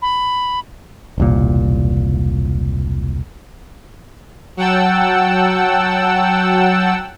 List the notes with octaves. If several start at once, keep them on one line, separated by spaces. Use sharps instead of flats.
B5
E1 C2 A#2
F#3 F#5 G5 A5 E6